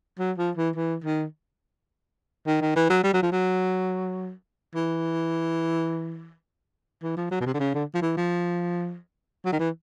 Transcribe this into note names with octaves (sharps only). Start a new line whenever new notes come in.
F#3
F3
E3
E3
D#3
D#3
D#3
E3
F#3
G3
F#3
F3
F#3
E3
E3
F3
F#3
B2
C3
D3
C#3
D3
F3
E3
F3
F#3
D#3
E3